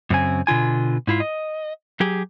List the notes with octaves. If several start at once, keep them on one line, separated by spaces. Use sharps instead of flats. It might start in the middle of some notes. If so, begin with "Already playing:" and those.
F#2 C#3 C4 G#5
B2 D3 F4 G#5
G#2 E4 F4
D#5
F#3 G4 G#4